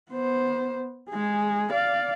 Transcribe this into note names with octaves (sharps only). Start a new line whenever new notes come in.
B3 C5
G#3 G#4
D5 F5